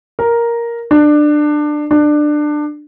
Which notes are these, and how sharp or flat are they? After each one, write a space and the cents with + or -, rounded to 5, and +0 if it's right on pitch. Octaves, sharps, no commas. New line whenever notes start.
A#4 +5
D4 +20
D4 +20